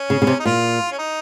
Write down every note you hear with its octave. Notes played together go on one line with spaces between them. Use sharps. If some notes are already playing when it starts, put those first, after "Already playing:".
Already playing: C#4
C#3
C#3
C3
D#4
A#2 F4
C#4
D#4